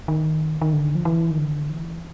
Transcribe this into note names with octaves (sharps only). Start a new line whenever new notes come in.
D#3
D#3
D3
F3
E3
D#3
D3
E3